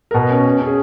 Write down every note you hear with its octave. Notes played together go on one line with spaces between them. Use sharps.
A#4
B2 B4
C#4
C#4
C#4
G#4